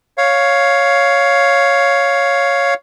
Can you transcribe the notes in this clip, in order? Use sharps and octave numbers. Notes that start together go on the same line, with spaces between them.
C#5 F5